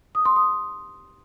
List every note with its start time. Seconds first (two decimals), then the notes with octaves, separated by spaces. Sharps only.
0.15 D#6
0.25 C6
0.36 D#6